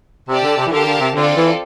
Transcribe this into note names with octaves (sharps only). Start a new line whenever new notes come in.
C3 G4 D5 A5
D3
C3
E3
D3 G4 A#4 F5 A5
D3
C3
D3 C4 F4 A4 D5
E3